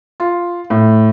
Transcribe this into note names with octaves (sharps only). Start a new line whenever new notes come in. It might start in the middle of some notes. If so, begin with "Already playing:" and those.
F4
A2